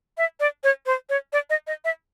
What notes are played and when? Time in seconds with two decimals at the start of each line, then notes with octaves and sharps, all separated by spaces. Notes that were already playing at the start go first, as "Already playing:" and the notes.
0.18 E5
0.40 D5
0.64 C#5
0.86 C5
1.09 C#5
1.33 D5
1.50 D#5
1.67 D#5
1.84 E5